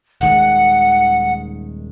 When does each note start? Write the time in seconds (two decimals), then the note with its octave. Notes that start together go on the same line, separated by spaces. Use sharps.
0.21 D#1 D#3 G#3 F#5